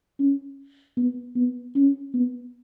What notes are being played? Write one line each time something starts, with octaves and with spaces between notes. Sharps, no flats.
C#4
B3
B3
C#4
B3